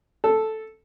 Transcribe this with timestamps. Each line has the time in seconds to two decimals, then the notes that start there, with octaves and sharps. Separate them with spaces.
0.24 A4